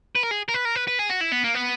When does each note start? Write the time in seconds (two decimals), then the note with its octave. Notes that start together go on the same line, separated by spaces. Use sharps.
0.16 B4
0.23 A#4
0.31 G#4
0.49 A#4
0.54 B4
0.65 A#4
0.76 B4
0.88 B4
0.99 G#4
1.10 F#4
1.21 E4
1.32 B3
1.44 A#3
1.55 B3